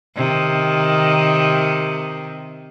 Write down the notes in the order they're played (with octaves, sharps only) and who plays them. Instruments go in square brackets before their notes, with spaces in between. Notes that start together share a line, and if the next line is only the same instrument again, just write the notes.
[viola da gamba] C3 D#3